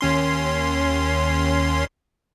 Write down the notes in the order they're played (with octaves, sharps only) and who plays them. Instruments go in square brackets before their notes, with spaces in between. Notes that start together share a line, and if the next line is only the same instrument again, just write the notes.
[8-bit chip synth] D#2 C#4 C6